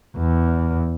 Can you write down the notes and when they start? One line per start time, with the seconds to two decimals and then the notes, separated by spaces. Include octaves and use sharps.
0.17 E2